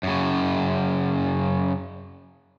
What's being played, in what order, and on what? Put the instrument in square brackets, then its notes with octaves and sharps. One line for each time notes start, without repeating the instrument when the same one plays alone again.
[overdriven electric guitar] F#2 C#3